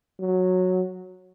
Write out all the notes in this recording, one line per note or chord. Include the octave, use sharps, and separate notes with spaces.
F#3